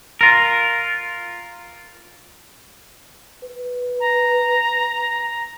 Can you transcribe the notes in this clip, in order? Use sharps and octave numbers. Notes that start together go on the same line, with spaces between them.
F4 A#4
B4
A#5